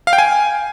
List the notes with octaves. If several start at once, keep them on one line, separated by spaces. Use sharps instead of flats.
F5
G5
G#5